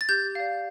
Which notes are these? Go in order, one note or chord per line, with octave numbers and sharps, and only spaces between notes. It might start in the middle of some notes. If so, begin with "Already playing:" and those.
A6
G4 G6
D5 F5